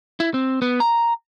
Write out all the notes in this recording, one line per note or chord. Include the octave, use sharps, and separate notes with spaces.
E4
C4
B3
A#5